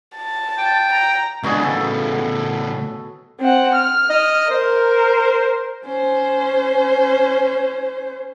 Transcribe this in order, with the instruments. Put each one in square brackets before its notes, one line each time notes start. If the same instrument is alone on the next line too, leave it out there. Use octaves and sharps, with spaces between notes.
[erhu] A5
[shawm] G5
[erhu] A#5
[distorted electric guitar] C#2 D4 [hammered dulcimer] B2 F#4 G#4
[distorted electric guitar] A2 C#3 [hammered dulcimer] A4
[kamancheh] C4 F#5
F6
[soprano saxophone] D#5
[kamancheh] A#4 [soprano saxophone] C5
[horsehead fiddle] C#4 C5